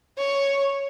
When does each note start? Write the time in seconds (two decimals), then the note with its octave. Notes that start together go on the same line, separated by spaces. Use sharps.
0.18 C#5